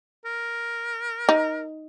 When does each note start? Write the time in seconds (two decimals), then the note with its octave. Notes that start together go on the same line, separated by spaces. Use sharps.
0.25 A#4
1.29 D#4